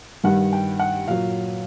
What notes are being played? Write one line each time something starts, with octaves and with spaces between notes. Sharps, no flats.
G2 D#3 G3 F#5
G5
F#5
A#2 F#3 F5